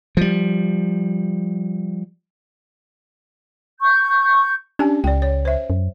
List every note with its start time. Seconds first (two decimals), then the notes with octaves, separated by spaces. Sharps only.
0.17 F3 G3
3.81 C#6 G6
4.79 C#4 D4 G4 G#5
5.04 C#2 D5 G5
5.22 C#5
5.45 C5 E5
5.70 F#2